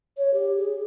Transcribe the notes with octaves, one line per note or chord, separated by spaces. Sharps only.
C#5
G4
G#4